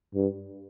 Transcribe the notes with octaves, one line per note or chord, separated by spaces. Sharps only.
G2